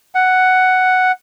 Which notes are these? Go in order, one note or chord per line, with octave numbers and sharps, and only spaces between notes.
F#5